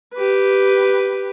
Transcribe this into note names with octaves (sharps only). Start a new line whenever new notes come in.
G4 B4